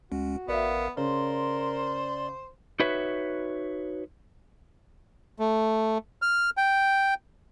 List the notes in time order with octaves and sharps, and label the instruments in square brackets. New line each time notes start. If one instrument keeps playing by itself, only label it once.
[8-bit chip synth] D2 G#3 C#4 [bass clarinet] F#4
[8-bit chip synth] A1 A#4 F5 [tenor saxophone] B3 [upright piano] D5 E5
[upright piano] C#3 [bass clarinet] A#4 [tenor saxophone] C5 [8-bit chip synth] D5 C6
[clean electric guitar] D#4 F#4 B4 C#5 E5
[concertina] A3
F6
G5